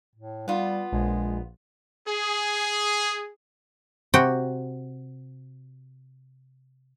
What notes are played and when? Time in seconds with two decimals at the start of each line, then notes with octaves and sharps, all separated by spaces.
0.16 A2
0.48 G3 B3 F4
0.92 A#1 G#3
2.07 G#4
4.14 C3 F#4 G5